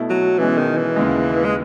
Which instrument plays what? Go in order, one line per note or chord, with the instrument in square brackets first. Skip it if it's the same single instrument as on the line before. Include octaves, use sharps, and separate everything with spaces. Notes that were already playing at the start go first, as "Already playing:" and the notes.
Already playing: [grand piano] B2 A3 E4
[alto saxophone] F#3
[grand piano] B2 G#3 C#4 [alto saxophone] E3
[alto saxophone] D#3
E3
[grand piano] D#2 C#3 G#3
[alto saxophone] G#3